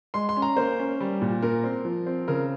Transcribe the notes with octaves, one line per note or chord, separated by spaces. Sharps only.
G#3 C6
C6
C#4
A#5
A#3 C5
C#4
G3
A#2
A#2 A#4
C4
F3
C4
C#3 A#4